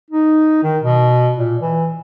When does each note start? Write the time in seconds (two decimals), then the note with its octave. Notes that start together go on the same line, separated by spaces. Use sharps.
0.10 D#4
0.63 D#3
0.82 B2
1.37 A#2
1.61 E3